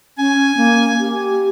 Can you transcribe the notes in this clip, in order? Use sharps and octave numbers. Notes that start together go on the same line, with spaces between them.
C#4 G#5
A#3
G4